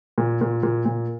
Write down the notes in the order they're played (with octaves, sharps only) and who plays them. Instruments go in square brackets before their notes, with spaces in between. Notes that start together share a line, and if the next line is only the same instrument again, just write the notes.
[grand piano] A#2
A#2
A#2
A#2